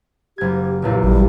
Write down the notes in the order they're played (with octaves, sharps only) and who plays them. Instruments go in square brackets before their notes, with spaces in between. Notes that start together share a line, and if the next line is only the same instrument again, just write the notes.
[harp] F#1 G#6 [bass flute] G4
[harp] B1 E2 A#2
[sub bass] A1 [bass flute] G3